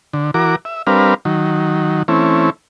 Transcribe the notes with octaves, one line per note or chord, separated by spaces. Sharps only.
D3
E3 F#4 A#4 D6
E5
G3 C4 D4 A#4 B4 F5
D#3 F#3
E3 A3 C4 C#4 E4